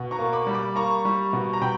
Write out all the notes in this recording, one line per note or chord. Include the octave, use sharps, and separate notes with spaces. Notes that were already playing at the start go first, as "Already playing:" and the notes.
Already playing: B2
A#5 C#6
A#3
B5 D6
G3
B5 D6
A#3 A#5 C#6
G3
B2
A#5
B2 G5 B5